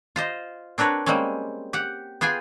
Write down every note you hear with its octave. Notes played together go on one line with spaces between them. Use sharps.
F4 C5 D#5
C4 D4 A#4 B4 C#5
G3 G#3 A#3 C4 C#4
G4 F#5
B3 F4 G#4 G5 G#5